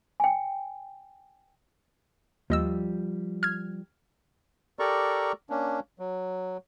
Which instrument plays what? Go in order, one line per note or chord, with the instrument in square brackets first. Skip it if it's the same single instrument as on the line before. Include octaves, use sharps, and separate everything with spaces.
[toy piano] G5 G#5
[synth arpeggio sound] D#2 D#5 E6 [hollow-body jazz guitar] F3 G3
[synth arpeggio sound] F6 G#6
[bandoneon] G4 A4 A#4 D5 A#5 C#6
A#3 C#4 D4
F#3